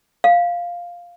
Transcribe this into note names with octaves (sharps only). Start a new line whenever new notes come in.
F5